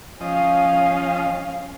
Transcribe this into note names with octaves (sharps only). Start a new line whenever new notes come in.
F3 C#4 D#5 F5